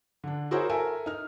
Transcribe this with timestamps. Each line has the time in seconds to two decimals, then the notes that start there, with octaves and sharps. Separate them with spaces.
0.24 D3 D4
0.51 E4 F#4 G#4 A#4 C5 C#5
0.69 A4 A#4 E5 G#5
1.06 D#4 F6